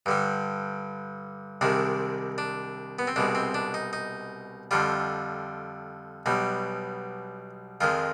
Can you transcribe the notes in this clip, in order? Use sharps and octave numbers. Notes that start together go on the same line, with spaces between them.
G2 D3 G3
C2 C3 D#3 G#3 D4
D4
B3
C4
C2 B2 G#3 D4
C4
D4
D#4
D#4
F2 D3 G3 F4
B1 B2 G3
F2 D#3 G#3 F4